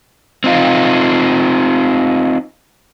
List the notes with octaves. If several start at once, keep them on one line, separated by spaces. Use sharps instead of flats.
C4 D#4 F4